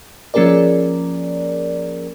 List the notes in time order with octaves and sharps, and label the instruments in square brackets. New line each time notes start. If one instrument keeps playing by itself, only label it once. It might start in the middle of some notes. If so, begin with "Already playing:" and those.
[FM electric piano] F3 A#3 C#4 G#4 A#4 D5